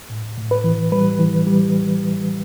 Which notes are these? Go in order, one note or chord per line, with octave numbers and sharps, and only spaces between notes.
A2
A2
B4
E3
G3 B4
E3
G3